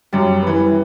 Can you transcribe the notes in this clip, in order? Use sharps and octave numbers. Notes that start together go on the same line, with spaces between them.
F#2 G3
E3 B3